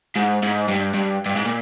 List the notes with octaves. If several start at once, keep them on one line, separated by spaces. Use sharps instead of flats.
G#2
G#2
G2
G2
G2
G#2
A#2